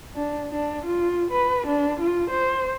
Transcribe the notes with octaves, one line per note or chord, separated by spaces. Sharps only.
D4
D4
F4
B4
D4
F4
C5